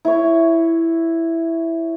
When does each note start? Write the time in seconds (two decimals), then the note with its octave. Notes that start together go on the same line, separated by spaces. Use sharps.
0.05 E4 C#5